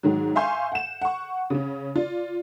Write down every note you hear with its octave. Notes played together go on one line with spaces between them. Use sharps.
G#2 D#3 F#3
E5 F5 G#5 C6 C#6 G6
F#5 E7
F#5 C#6
C#3 C#4
F4 D5